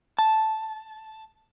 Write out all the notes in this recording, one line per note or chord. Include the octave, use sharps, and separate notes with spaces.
A5